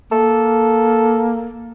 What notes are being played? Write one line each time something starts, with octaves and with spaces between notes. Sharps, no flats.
A#3 A4